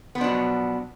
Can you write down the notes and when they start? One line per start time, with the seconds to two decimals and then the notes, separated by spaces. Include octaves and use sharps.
0.15 B3
0.18 F3
0.21 D4
0.24 F#3
0.27 B2